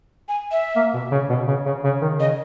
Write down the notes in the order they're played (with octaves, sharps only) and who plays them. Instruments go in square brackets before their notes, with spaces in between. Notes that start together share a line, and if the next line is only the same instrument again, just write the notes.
[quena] G#5
E5
[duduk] A#3
B2
C#3
B2
C#3
C#3
C#3
D#3
[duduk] C#3 [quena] D#5